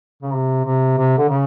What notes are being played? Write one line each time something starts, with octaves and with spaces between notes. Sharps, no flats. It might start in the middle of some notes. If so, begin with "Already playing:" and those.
C#3
C3
C3
C3
D3
C#3